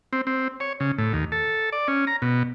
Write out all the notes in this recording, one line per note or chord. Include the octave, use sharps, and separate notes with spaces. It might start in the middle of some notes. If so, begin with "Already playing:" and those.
C4
C4
C#5
C#3
A2
D#2
A4
D5
C#4
A#5
B2